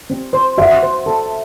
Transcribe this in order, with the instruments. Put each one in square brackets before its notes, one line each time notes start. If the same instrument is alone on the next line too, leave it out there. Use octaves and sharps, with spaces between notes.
[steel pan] C4
C5
[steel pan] F#4 [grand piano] E5
[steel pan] C5
A4